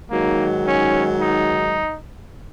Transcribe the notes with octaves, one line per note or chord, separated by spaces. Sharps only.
G#2 D#3 F#3 A#3
C#4
D#4